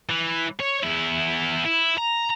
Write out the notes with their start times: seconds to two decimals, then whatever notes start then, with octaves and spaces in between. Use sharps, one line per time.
0.10 E3
0.60 C#5
0.83 E2 E4
1.64 E4
1.98 A#5